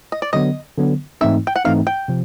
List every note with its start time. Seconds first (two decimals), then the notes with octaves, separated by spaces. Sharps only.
0.12 D#5
0.22 D5
0.33 D3 F#3 B3 D#5
0.77 D3 F#3 B3
1.21 G#2 E3 A3 C4 D#4 E5
1.47 G5
1.56 F#5
1.65 G#2 E3 A3 C4 D#4 F5
1.87 G5
2.08 C3 F3